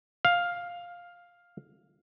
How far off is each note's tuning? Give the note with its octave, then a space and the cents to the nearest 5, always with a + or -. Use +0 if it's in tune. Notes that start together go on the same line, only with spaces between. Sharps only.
F5 +5